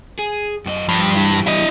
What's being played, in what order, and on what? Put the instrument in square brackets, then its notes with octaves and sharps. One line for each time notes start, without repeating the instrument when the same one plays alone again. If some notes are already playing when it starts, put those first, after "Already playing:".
[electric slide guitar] G#4
F#2 F#4 D#5
[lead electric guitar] G2 [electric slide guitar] F3
[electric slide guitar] E3 G3
[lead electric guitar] E4 D#5